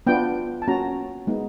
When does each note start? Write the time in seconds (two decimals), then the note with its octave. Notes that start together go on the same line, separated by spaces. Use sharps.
0.07 B3 D4 F4 G5
0.62 A5
0.67 A#3 C#4 F#4 A#5
1.27 G#3 B3 D#4